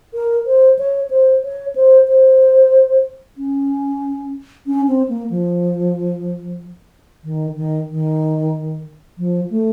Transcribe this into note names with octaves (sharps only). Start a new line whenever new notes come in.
A#4
C5
C#5
C5
C#5
C5
C5
C#4
C#4
C4
A#3
F3
D#3
D#3
D#3
F3
A3